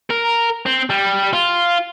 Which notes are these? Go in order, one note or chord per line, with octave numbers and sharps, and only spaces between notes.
A#4
C4
G3
F4